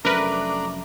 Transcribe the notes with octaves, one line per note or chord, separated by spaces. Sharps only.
F1 F#3 A3 C#4 D4 A#4 B4 A#5